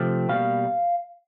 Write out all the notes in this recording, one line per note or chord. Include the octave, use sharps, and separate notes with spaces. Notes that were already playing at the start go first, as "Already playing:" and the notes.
Already playing: C3 F3 A3 C4
B2 G3 A#3 F5